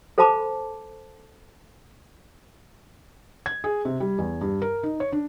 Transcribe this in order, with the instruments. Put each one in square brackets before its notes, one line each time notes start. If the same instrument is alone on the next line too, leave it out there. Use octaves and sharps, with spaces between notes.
[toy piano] A4 C5 F5 A5 B5 D6
[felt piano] G#6
G#4
C3
G3
E2
G2
A#4
D#4
C#5
D4